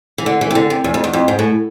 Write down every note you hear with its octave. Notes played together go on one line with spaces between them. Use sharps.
E3
D3
E3
C3
D3
C3
E2
F2
E2
F2
G#2
A2